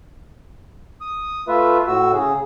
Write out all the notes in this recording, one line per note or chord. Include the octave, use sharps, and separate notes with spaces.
D#6
A3 F4 B4 E5
A2 F#4 E6
C#3 G#4